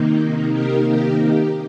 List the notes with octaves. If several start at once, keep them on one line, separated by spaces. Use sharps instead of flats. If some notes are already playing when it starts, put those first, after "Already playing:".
Already playing: C3 D#3 A#3 D#4
G4 A#4
G4 A#4
G4